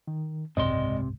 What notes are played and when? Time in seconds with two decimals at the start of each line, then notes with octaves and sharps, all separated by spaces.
0.08 D#3
0.57 F#1 C2 G#2 C3 G#3 D5 D#5 C6